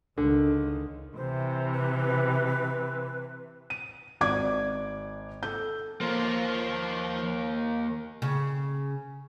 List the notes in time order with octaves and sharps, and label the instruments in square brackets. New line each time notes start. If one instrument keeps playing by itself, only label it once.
[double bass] C#2 D#3 [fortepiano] D3
[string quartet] C3 E3 [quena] C5
[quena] B4
[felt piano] D#7
G#1 D5 D6 G#6
A4 G6
[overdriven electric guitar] D#2 A#3 [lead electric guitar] F3 C5
[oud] C#3